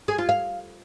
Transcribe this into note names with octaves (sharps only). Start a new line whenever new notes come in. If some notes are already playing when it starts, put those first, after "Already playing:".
G#4
F4
F5